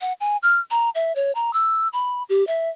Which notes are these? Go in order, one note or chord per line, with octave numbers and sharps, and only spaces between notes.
F#5
G#5
F6
A#5
E5
C#5
A#5
E6
B5
G4
E5